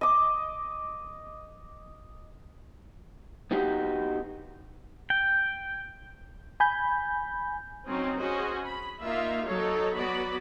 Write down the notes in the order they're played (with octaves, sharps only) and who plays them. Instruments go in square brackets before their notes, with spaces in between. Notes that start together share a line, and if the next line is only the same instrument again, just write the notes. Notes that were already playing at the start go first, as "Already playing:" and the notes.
[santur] D#5 D6
[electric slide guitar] B3 D#4 F#4 G4
[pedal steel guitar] G5
[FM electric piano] G#5 B5 G6
[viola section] F#3 C4 C#4 D#4
C#4 F#4 G#4 C5 D#5
B5
A#3 D#4 F4 E5 F5
F#3 D#4 A4 C#5
F#3 B3 F#4 D5 B5